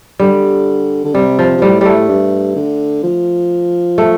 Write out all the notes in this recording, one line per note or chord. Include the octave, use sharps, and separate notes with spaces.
D3 G3
D3
C3 G3
F3
C3
A2 G3
G3 A3
G2
D3
F3
A3